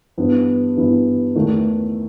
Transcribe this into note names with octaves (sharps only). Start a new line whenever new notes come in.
G2 E3 B3 E4
G2 E3 B3 E4
E2 D#3 A3 E4